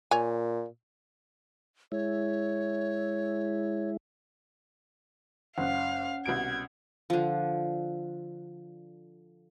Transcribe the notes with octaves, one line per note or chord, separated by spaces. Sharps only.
A#2 C#5 G#5
G#3 E4 C#5
F#1 C#4 F5 F#5
C2 B2 G#6 D7
D3 F3